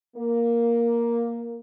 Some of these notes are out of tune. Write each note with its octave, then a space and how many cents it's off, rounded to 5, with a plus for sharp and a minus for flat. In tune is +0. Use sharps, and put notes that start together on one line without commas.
A#3 +5